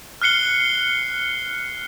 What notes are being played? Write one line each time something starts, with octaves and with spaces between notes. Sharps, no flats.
F6 F#6 C7 C#7 G7